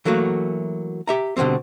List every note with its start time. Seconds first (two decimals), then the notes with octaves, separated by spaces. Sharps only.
0.05 E3 F#3 A3 A#3 F#4
1.07 G4 E5 A#5
1.37 B2 D3 D#3 G3 C4